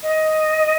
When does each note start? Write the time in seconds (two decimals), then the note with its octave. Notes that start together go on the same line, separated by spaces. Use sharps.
0.03 D#5